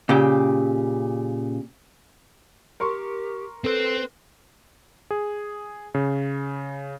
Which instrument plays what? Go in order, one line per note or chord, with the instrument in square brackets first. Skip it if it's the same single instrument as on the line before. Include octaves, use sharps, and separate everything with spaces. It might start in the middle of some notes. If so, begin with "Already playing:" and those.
[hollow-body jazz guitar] A#2 C#3 G4
[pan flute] G4 [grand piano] A#4 C6 C#6
[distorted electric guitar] C4 C5 [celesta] A4 [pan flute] B4
[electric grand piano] G#4
C#3